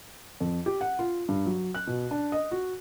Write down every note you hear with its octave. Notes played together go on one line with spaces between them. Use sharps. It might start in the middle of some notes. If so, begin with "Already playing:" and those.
F2
G4
F#5
F4
G2
F#3
F#6
B2
D4
D#5
F#4